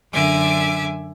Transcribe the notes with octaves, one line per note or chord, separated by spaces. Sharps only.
F#2 D3 E5 G#5 D6